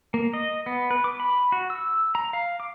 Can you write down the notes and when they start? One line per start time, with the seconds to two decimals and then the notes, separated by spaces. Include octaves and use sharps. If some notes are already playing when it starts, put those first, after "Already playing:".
0.14 A#3
0.33 D#5
0.66 B3
0.91 B4
1.04 D6
1.20 B5
1.52 F#4
1.70 E6
2.15 A#5
2.33 F5
2.60 D6